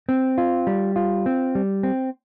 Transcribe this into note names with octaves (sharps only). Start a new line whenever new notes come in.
C4
F4
G3
F4
C4
G3
C4